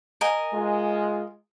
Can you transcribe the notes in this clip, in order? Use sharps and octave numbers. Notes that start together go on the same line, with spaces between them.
A#4 D#5 G#5
G#3 F4